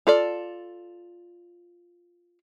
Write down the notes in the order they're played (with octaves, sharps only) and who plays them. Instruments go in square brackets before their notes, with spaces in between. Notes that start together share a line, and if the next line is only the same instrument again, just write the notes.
[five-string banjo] F4 A4 D5